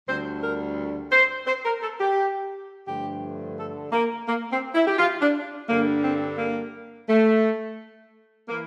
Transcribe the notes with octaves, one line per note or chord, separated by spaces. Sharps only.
D2 D3 G3 C5
A#4
C5
C5
A#4
A4
G4
G2 D3 F3 A3 G4
A4
A#3
A#3
C4
E4
G4
F4
D4
G2 D3 G3 A#3
C4
A#3
A3
E3 A#3